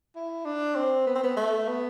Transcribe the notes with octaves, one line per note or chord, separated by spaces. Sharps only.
E4
D4
C4
B3
C4
B3
A3
B3